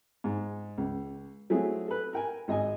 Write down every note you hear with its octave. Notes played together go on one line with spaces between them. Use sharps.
G#2
C#2
F#3 A3 C4 E4 G#4
A4 B4
A#4 G5 G#5
G#1 D#5 G#5